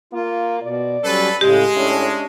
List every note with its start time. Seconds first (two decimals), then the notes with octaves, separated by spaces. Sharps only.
0.13 A#3 F4
0.63 B2 D5
1.04 F#3 G3 C#4 A4 B4
1.41 A2 C#3 G#3 G4
1.76 A2 C#4 D4